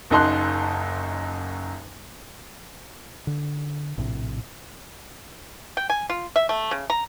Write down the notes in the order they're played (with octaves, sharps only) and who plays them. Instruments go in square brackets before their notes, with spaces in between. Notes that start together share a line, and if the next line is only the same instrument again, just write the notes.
[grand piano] F#1 F#2 D#4 A5 C6 F#6
[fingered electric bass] D3
A#1 A2 C3
[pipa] G5
G#5
F4
E5
A3
C#3
A#5